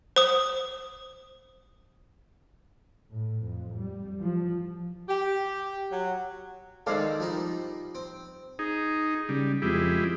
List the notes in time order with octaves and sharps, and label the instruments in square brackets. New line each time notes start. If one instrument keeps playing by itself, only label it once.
[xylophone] C5 D#6
[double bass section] A2
F2
G3
F3
[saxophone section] G4
F#3
[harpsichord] D#3 G#3 C4 [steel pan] A4 D5 F5
[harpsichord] F3 G3 D#4
C4
[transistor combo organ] D#4 G#4
[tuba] C#3 [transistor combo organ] G3
[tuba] F2 [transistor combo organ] G#3 E4 G4